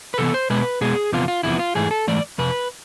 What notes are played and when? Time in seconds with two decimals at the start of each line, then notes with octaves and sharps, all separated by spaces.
0.14 B4
0.18 C3 E3 B3 A4
0.34 C5
0.50 B2 G#3 B3 B4
0.81 B2 G#3 B3 G#4
1.12 E2 C3 F3 B3 F4
1.28 F4
1.43 E2 C3 F3 B3 E4
1.59 F4
1.75 G#2 E3 A3 G#4
1.91 A4
2.07 G#2 E3 A3 D5
2.38 F2 C3 B4